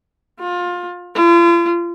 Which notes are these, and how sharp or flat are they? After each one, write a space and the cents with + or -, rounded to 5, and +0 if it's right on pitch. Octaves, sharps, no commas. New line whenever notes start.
F4 +25
F4 -40